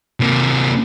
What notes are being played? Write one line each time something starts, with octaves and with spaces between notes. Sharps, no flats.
C3 A#3